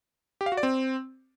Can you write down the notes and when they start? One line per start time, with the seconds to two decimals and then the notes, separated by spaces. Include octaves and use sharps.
0.41 G4
0.46 F5
0.52 F#4
0.57 D5
0.63 C4